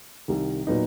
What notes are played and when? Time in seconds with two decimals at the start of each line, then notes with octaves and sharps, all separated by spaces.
0.28 C2 C3 D#3
0.67 A#2 F#3 B3 D#4